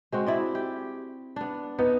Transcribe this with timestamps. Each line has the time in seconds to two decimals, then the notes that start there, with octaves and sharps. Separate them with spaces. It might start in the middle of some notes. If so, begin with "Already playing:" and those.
0.12 G#3 C4 F#4
0.26 E4 D5 D#5
0.55 G4
1.36 B3 D4
1.79 B3 D#4